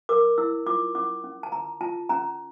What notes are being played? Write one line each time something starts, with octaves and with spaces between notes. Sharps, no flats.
A#4 D6
E4 E6
F4 D6
C#4 D6
C#4
A5
C#4 A#5
F4 A5
C#4 A#5